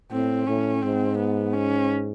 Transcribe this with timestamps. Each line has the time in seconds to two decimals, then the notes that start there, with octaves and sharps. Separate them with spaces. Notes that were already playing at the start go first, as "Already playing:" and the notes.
0.11 A2 C4
0.47 A2 C#4
0.82 G#2 C4
1.18 B3
1.53 C#4